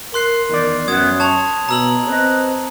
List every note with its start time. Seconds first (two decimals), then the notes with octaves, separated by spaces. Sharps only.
0.14 A#4 C6 F#6 C7
0.50 E2 D#3 D5
0.88 F#2 F#3 B3 D#6 G#6
1.20 C#5 A5 G#6 F7
1.69 B2 A#5 E6 F#7
2.08 C4 B4 D#5